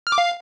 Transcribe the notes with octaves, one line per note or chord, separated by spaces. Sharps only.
F6
D6
F5